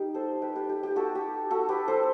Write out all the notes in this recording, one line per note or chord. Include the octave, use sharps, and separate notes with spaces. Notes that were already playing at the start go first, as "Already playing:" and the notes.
Already playing: G3 D#4 G4
A4 C5
G4 B4
G4 B4
G4
G4
F#4 A4
G4
F#4 A4
G4 B4
A4 C5